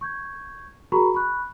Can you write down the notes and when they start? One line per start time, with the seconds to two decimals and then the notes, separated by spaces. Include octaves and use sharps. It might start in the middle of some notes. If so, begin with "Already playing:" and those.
0.01 C#6 G6 G#6
0.92 F#4 G#4 A#4 A#5 B5 C#6
1.14 B5 C#6 F#6